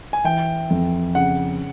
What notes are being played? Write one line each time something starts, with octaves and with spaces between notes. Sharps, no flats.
G#5
E3 G5
F2
C#3 F#5